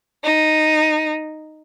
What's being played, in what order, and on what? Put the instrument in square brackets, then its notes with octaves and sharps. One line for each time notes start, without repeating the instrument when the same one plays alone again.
[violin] D#4